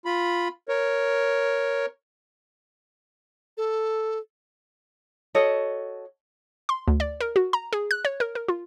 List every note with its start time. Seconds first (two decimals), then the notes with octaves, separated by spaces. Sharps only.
0.05 F4 B5
0.69 A#4 C#5
3.57 A4
5.35 F#4 A4 C#5 D#5
6.69 C6
6.88 D2
7.00 D5
7.21 A#4
7.36 F#4
7.53 A#5
7.73 G#4
7.91 F#6
8.05 C#5
8.20 A#4
8.35 A#4
8.48 F4